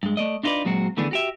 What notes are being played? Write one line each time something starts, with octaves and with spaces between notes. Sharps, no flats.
G2 G#3
A3 D5 D#5
D4 D#4 F4 G#4 B4 D5
A#2 F#3 G#3 C4 F#4
D3 E3 A3 B3 D4 G#4
F#4 G4 E5